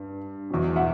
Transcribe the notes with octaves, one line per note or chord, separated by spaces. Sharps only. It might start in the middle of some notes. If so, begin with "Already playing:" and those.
Already playing: G2
E2 B2
E5 F#5